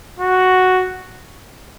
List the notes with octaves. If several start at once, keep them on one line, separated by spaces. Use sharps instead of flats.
F#4